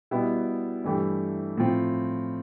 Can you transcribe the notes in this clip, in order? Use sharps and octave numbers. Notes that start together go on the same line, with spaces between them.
B2 G3 B3 E4 G4
G2 E3 A3 E4 G4
A2 F3 C4 F4